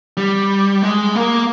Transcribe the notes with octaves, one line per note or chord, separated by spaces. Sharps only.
G3
G#3
A#3